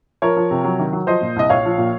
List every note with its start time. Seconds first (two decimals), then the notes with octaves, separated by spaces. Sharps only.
0.22 F3 A#4 C#5
0.36 F3
0.50 C3
0.64 F#3
0.79 D#3
0.92 F#3
1.07 F3 C5 D#5
1.21 A#2
1.36 C2 D#5
1.49 A#1 C#5 F5
1.65 F3
1.78 A#2